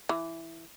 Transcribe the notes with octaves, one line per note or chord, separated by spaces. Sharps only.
E3